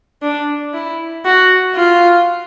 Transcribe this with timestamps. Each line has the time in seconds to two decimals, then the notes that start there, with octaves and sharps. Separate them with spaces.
0.22 D4
0.74 E4
1.25 F#4
1.76 F4